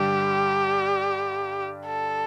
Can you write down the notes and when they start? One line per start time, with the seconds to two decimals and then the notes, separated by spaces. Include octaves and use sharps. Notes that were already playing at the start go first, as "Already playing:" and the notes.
Already playing: G2 D3 G3 D4 G4
1.86 A4